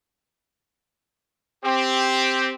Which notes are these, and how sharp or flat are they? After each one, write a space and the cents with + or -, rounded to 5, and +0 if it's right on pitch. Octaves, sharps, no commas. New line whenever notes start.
C4 +0 G4 +0